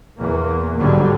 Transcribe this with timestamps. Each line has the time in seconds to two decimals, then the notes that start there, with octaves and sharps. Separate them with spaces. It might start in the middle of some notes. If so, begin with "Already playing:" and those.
0.17 E2 A#3
0.75 B1 G#2 D3 F#3 G3